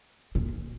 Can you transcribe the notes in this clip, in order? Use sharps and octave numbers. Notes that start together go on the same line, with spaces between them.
A#2